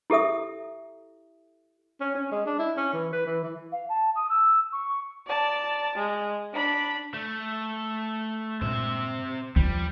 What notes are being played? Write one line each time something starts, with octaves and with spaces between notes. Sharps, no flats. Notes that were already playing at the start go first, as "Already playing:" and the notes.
E4 G4 A4 E5 D#6
C#4
C#4
G#3
D4
E4
C#4
E3
B4
E3
E3
F5
A5
D#6
E6
C#6
D5 A5
G#3
D4 B5
A3
G2 A#2 G#3 C4 E5
D#2 F3 G3